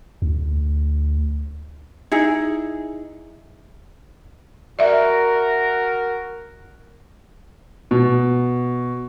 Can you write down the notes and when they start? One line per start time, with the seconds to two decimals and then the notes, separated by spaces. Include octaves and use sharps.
0.22 D2
2.12 D#4 E4 G#4
4.79 F#4 A#4 D5 E5
7.91 B2